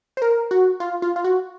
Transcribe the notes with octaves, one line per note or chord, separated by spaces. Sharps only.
C5
A#4
F#4
F4
F4
F4
F#4